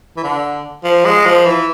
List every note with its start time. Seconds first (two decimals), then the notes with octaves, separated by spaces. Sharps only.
0.17 E3
0.24 D3
0.84 F3
1.05 G#3
1.25 F3
1.46 E3